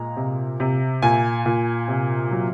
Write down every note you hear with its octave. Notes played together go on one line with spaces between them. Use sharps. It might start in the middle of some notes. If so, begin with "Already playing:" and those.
Already playing: A#2 G#3 A#5
C3
C3
A#2 G#5
A#2
C3
F#3